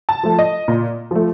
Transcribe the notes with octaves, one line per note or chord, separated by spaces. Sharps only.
A5
F3 A3
D#5
A#2
F3 A3